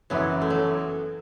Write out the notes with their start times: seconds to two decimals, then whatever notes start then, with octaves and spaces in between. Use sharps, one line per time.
0.10 F#1 F#2 E3 F#3 B3 C#4 E4
0.42 A3
0.50 F#3